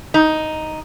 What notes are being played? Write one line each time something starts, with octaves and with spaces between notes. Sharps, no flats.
D#4